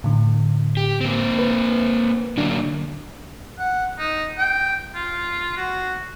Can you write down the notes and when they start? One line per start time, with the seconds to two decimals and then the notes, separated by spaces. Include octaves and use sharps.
0.04 A2 D3
0.77 G4
1.01 A#3 C4
1.39 B4
2.38 D3 F#3 A#3 D4
3.59 F#5
3.98 D#4
4.38 G5
4.95 F4
5.57 F#4